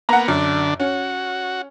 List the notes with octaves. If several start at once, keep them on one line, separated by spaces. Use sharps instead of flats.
A#3 B3 F#5 A#5
F#2 D3 D4
C#4 F#4